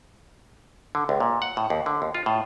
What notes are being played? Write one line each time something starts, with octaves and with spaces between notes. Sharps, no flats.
D3
C#2
A#2
F#5
A2
D#2
D3
D#2
F4
A2